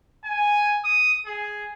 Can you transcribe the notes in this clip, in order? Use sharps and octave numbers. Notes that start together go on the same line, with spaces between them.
G#5
D#6
G#4